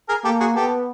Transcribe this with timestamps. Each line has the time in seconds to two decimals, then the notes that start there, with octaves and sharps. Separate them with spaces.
0.09 G#4 A#4
0.24 A#3 G4 A4
0.40 F#4 G#4
0.56 B3 G4 A4